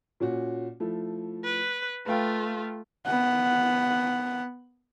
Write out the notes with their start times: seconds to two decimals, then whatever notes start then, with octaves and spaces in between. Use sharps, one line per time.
0.20 A#2 C#4 F#4
0.80 F3 A3 E4
1.44 B4
2.06 A3 F4 B4 F5 G5
3.05 B3 F#5